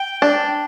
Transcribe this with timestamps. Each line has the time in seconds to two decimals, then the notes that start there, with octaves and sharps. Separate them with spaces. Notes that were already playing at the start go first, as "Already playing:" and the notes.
Already playing: G5
0.22 D4